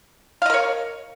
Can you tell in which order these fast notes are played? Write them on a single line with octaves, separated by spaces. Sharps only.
F5 D#5 A#4 C#5